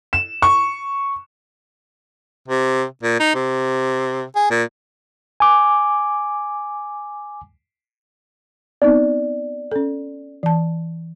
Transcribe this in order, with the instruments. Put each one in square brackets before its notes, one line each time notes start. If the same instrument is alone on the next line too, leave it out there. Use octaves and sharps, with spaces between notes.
[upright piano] E7
C#6
[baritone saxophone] C3
A#2
D#4
C3
G#4
A#2
[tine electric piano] G#5 D6
[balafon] B3 C4 D#4 [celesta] D5
[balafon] C#4 A4
E3 A5